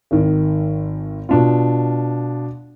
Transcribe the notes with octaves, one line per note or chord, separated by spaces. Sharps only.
G#1 D#3
B2 D4 F4